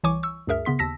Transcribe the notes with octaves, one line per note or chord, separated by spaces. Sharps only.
C2 E3 C#5 G#5 C#6 D6
C#6 E6
D2 G2 G#4 A#4 E5 F6
C#3 B3 C6 B6
D#2 A5 E6 A#6 B6